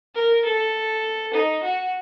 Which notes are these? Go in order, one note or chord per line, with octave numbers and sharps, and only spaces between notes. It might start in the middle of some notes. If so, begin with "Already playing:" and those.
A#4
A4
D#4
F#4